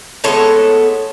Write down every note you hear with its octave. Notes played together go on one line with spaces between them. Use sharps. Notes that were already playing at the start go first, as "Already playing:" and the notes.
A2 G#3 B3 A4 C#5